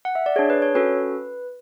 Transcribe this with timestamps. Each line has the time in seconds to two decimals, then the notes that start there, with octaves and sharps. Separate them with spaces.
0.05 F#5
0.15 E5
0.26 D5
0.36 D4 G#4 C#5
0.50 B4
0.62 C#5
0.75 C#4 F#4 A4 B4